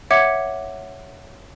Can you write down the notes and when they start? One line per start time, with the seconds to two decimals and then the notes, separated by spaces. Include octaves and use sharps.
0.11 C#5 E5 F#5 D6 G#6 C#7